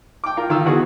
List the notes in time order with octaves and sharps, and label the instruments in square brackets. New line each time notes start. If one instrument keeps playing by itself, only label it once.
[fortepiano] G5 D6
F4 A#4
D#3 F4 F5 E6
D#3 E3 B3 F#4 G#4